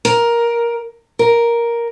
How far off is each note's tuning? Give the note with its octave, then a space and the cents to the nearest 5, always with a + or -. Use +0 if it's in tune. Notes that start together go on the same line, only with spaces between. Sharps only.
A#4 +10
A#4 +5